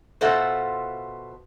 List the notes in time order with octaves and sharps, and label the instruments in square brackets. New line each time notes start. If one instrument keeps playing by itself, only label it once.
[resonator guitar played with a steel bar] B2 F4 A4 C5 E5 F#5